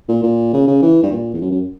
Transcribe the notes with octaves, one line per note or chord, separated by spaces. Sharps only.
A#2
A#2
C#3
C#3
E3
G2
A#2
E2
F#2
F#2